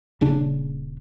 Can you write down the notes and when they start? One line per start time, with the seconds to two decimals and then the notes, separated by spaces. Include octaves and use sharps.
0.21 D#1 C#3 D4